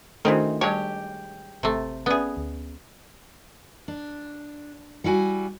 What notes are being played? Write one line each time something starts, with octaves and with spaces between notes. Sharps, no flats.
D#3 E3 A3 C4 D4 D#4 F#4 A4
G3 G#3 G4 C#5 A5
G#1 C3 A3
B3 C#4 G#4 D5 E5
D2
D4
G3 E4 F#4 G#5